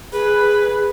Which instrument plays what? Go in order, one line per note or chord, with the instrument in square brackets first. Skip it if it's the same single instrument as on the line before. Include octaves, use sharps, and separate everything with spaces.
[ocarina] G#4 [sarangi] B4